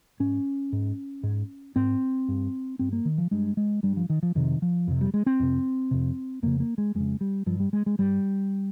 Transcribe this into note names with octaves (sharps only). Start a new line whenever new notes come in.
G#2 C#4
G#2
G#2
G#2 C4
G2
G2 C4
A#3
D#3
F3
G2 G#3
G#3
G2 G3
F3
D#3
F3
F2 C3 D#3
F3
F2 C3
G3
G#3
C4
F2 C3
F2 C3
F2 C#3 A#3
A#3
G#3
F2 C#3 G#3
G3
G2 F3
G3
G#3
G#3
G2 G3